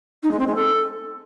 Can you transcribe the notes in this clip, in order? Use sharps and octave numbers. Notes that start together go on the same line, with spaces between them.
D#4
G#3
C4
G#3
A4